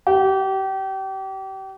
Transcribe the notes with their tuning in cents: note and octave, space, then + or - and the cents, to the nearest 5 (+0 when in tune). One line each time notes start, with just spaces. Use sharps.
G4 -30